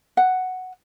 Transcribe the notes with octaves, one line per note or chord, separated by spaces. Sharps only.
F#5